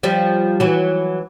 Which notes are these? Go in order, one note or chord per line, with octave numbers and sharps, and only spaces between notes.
F3 G3
E3 F#3